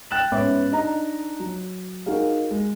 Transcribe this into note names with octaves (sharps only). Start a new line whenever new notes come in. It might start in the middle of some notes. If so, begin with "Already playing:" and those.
G5 F#6 A6 E7 F#7
G#2 B3 C#4 E5 D6
D4 D#4 D#5 A#5
F#3
D#4 F#4 G#4 A#4 F5
G#3